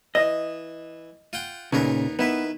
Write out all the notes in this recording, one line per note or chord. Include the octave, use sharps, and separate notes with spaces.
E3 D#5
F4 F#5 G5
D#2 A#2 C#3 B3 A#4
D#3 B3 E4 B4